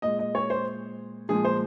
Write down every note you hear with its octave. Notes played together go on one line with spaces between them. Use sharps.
A#2 G#3 D#5
D#5
C#5
C5
A#2 F3 G#3 G#4
C5